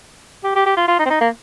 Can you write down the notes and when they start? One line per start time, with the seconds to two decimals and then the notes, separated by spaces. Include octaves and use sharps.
0.44 G4
0.55 G4
0.66 G4
0.77 F4
0.88 F4
0.99 D#4
1.06 C4
1.10 D#4
1.21 A#3